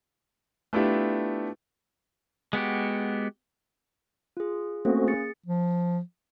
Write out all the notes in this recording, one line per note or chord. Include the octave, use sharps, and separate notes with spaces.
A3 B3 D4 E4 F4 G4
G#3 B3 F#4 G4
F4 G#4
A3 A#3 C4 C#4 F#4
G#4 A6 C#7
F3